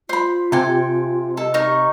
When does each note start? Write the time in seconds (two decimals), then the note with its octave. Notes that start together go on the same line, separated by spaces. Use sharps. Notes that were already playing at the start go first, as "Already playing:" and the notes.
0.09 F4 C5 B5
0.52 C3 A4 G5 G#5
1.37 A4 D#5
1.54 D#4 A#4 C#6